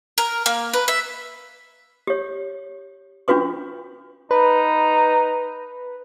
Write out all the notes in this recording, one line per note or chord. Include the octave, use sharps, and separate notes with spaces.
A#4
A#3
B4
E5
G4 C#5
C#4 D4 F4 F#4 B4 C#6
D#4 B4